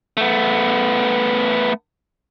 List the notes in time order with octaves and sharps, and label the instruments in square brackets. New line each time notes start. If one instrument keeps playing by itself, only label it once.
[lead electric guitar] A3 B3